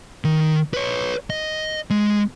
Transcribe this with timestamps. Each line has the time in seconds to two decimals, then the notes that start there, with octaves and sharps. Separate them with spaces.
0.24 D#3
0.74 B4 C#5
1.30 D#5
1.90 G#3